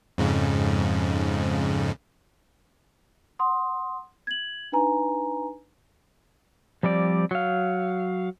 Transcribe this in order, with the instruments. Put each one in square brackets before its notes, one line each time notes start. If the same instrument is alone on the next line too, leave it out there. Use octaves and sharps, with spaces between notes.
[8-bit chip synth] F2 G#2 C#3
[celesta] F#5 C6 D#6
G#6 F#7
D4 D#4 B4 G#5 A#5
[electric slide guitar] F3 G3 C4 D5
F#3 F5